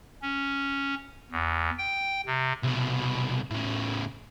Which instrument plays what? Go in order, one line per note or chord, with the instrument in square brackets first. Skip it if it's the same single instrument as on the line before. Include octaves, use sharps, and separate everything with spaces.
[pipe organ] C#4
E2
G5
C3
[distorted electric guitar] C2 B2
A2 C#3